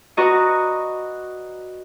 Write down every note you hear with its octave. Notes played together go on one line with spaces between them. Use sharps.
F#4 B4 D5 D#5 A#5 C#6